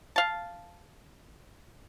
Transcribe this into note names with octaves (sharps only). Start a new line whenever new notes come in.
F5 A5